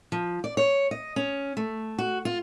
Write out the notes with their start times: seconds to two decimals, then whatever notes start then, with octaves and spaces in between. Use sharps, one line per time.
0.12 F3
0.44 D5
0.57 C#5
0.91 D#5
1.16 C#4
1.57 A3
1.98 F#4
2.25 F4